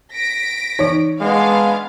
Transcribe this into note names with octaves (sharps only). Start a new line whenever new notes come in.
A#6 B6 D7
E3 D#4 C#5
G#3 B3 D4 F5